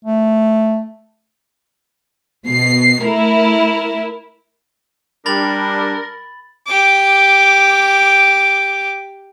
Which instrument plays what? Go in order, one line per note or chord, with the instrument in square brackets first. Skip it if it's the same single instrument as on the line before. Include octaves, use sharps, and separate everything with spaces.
[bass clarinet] A3
[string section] B2 C7
A3 E4 A#4
[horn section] G3 D4 [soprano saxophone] A#4 [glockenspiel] B5 A6 F#7
[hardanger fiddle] G4 D6